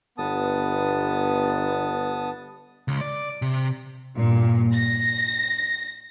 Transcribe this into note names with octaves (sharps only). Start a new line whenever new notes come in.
G1 B3 A5 D#6
C#2
D5
C3
G2 A#2
A#6